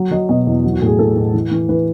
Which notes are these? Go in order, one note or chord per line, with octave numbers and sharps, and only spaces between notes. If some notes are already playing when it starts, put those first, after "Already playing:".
Already playing: F#3
F#3 D#5
B2 D#5
E2
F#3
F#4
A2 G#4
A2 A4
A2
E3
E3
E3 B4